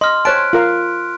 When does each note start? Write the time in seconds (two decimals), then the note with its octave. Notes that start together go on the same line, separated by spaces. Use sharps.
0.01 D#5 C6 F6
0.25 C5 C#5 A5 F#6 B6 D7
0.53 F4 A#4 F5